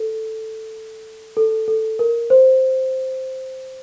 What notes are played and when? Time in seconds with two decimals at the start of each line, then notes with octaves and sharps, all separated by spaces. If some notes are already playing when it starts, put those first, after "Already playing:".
Already playing: A4
1.37 A4
1.68 A4
1.99 A#4
2.30 C5